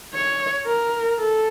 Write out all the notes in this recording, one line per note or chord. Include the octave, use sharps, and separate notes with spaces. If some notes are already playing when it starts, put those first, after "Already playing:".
C#5
A#4
A4